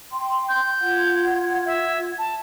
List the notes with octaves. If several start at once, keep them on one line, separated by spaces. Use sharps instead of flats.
G5 C6
G6
F4 F#5 G#6
E5
A5